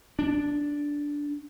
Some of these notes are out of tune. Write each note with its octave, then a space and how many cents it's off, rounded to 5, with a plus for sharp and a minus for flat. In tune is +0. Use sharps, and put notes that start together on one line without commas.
D4 -10